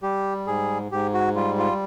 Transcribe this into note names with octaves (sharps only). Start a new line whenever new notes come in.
G3 G4
G#2 G#4
G#2 G4
F#4
G3 F4
F4